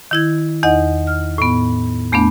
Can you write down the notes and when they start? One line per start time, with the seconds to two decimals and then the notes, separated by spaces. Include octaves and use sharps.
0.11 D#3 E4 G#6
0.63 E2 D#4 D#5 F#5
1.07 F6
1.38 A2 B3
2.12 E2 A3 B3 D4